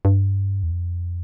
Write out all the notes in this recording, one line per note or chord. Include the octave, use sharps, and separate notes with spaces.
G2
E2
F2